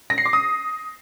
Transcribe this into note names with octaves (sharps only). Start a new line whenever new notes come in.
A#6
C7
D6
D#6